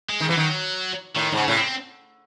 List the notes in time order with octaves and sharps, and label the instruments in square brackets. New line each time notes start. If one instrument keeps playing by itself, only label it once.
[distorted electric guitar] G#3
[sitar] D#3
[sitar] E3 [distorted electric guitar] F#3
[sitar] D#3
[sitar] A2 [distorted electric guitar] D#3
[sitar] G#2
[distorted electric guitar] C#3
[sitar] A2
[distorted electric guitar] C4